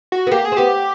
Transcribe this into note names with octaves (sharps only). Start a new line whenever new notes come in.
F#4
B3
A#3 G4
G#4
C4
B3 G4